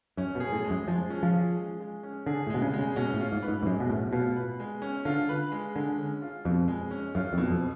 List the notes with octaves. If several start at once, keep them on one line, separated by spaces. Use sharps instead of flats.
F#2 C#4
B2
G#4
A2
G#3
F#2
F3 G#3
C#4
F3
G#4
G#3
G#3
C#4
D3 G#4
A2
B2 G#3
C#3
G#3
C#3
B2 C#4
A2
F4
G#2
B4
G#2
G#2
F#2 G#3
B2
A2 C#4
B2 F4
B4
G#3
C#4
D3 F4
B4
G#3
D3 G#3
C#4
F4
F2 B2
G#3
C#4
F#2 F4
F2
B2
F2